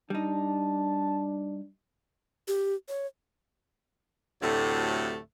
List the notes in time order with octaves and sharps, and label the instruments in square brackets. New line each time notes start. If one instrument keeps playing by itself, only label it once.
[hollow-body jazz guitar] G3 D#4 [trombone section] D4 [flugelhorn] A5
[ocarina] G4
C#5
[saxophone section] D2 A2 C3 F#3 A3